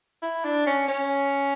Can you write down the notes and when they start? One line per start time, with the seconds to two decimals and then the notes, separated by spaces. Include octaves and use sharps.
0.22 E4
0.44 D4
0.66 C#4
0.88 C#4